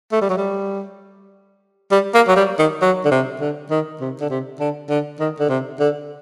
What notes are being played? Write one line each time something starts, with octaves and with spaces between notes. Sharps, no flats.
A3
G3
F#3
G3
G3
A#3
F#3
G3
D#3
F#3
D3
C3
D3
D#3
C3
D3
C3
D3
D3
D#3
D3
C3
D3